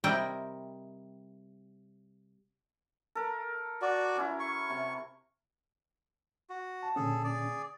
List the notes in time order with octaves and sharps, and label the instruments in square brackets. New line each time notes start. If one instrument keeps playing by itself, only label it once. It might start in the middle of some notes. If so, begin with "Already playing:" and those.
[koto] C3 G3 E4 A#4 D#5 G5
[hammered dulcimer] A4 A#4
[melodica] F#4 D5
[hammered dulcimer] F#3 C#4 E4
[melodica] C#6
[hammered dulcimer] C3
[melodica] F#4
[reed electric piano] A5
[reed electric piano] A#2 D3 C#4 [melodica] G#4 A4
[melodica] G#4 D5